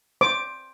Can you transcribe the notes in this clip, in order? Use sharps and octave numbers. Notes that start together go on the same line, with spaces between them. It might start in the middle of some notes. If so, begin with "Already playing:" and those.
C5 D6